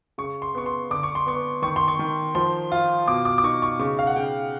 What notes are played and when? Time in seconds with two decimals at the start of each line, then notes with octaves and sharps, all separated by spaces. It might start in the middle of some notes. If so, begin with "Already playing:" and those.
0.18 C#3 C#6
0.42 C6
0.55 B3 C#6
0.66 C6
0.91 D3 D6
1.03 C#6
1.15 C6
1.26 B3 C#6
1.62 D#3 C#6
1.76 C6
1.88 C#6
1.99 D#3
2.35 F3 C6
2.72 F4
3.07 B2 D6
3.25 D6
3.38 D6
3.43 D#4 C#6
3.62 C#6
3.79 C#3 C#6
3.99 F5
4.07 F#5
4.16 C#3 G5